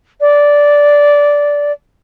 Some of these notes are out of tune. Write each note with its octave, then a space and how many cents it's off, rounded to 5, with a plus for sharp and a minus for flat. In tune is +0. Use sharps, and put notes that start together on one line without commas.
D5 -10